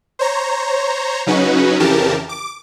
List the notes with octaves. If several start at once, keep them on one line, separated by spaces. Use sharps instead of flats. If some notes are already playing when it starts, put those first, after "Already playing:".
C5 C#5 A#5
C#3 F#3 C#4 D#4 F#4 B4
F2 C#3 E3 G4 A#4 A5
D6